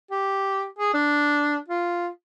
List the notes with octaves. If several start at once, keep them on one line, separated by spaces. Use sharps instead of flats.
G4
G#4
D4
F4